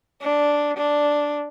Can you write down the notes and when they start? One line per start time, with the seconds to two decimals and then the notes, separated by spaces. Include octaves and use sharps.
0.22 D4
0.77 D4